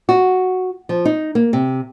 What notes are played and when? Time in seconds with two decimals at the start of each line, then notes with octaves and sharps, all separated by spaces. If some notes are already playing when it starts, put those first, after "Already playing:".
0.09 F#4
0.89 F3
1.05 D#4
1.35 A#3
1.53 C3